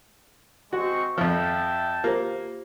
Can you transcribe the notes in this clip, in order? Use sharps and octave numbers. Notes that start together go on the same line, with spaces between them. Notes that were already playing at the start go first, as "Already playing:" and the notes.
G#3 C4 F#4 C#6
F2 F3 E5 G5 A5
A#3 F4 G4 C5